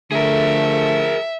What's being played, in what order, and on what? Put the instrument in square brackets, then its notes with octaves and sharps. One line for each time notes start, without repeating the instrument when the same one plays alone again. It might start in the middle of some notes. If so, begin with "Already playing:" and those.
[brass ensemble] D3 F3 A3 [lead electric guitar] G#4 A#4 [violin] E5